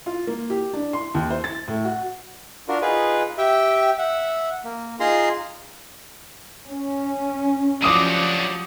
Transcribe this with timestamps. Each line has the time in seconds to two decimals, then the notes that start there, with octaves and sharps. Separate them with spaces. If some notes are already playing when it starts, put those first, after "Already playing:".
0.06 F4
0.27 A#3
0.50 G4
0.74 D4
0.93 C6
1.14 D#2
1.30 C5
1.44 A6
1.68 A2
1.85 F#4
2.68 D4 F4 F#4 A#4
2.81 D#4 F4 G#4 B4
3.38 G4 E5 G5
3.98 E5 F#5
4.64 A#3
5.00 D#4 F4 G#4 A#5 C6
6.66 C#4
7.82 F3 F#3 D4 F#4 G4 D6 D#6 D#7